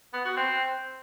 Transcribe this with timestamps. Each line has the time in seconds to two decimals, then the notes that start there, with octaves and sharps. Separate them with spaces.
0.13 B3
0.25 F#4
0.37 C4